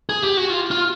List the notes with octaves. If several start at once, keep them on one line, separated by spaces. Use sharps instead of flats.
G#4
G4
F#4
F4
F4